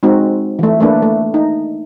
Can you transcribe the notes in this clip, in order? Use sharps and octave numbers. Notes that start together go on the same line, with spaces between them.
G#3 C4 D#4 F#4
E3 A3
A3 A#3 D4 B4
A3
D#4